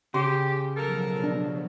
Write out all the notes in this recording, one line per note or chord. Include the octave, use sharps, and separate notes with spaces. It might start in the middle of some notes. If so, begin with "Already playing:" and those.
C#3 G4 C6
B2 F3 F#3 A4 A#4
D4